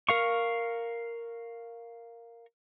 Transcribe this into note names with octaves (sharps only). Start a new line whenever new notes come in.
A#4 F5 C#6